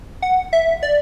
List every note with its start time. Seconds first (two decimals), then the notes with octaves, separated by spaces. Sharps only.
0.22 F#5
0.53 E5
0.83 D5